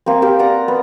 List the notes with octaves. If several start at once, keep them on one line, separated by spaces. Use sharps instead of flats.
A#3 C4
G4 A#4 C5 F5
D5 F#5 A#5
B3